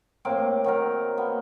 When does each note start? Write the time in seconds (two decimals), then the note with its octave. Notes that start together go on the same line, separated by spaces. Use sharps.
0.25 A2 A#3 C4 D6
0.64 D#3 F#3 A#4
1.17 A#3 B3